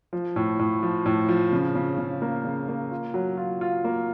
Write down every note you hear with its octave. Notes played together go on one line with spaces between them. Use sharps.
F3
A2
A2
F3
A2
F3
C#3
C#3
C#3
A#3
C#3
A#3
F4
F#3
F4
F4
A#3